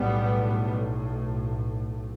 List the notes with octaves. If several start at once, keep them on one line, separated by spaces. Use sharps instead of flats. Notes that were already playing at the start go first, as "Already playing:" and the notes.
Already playing: B1 A2 G3 B3